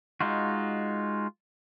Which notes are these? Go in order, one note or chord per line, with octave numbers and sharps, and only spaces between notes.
G#3 D#4 F4 F#4